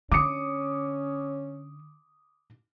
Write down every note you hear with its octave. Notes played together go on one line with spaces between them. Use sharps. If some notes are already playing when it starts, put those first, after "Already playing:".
D3 C#4 D6 D#6 C#7